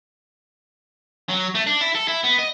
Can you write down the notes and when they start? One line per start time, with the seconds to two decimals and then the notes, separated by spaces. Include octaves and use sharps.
1.29 F#3
1.55 A3
1.67 D4
1.81 E4
1.95 A4
2.08 E4
2.24 B3
2.39 D#5